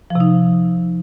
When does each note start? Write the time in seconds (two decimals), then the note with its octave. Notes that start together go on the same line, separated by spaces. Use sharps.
0.10 F3
0.15 C3
0.20 D#4